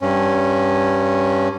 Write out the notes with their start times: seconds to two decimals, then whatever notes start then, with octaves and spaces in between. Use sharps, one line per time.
0.01 G2 C#4